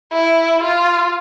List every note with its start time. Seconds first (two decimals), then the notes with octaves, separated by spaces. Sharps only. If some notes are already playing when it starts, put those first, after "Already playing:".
0.12 E4
0.63 F4